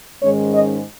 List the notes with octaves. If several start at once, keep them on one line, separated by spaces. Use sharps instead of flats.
G#2 D#3 G#3 C#4 C#5
D#5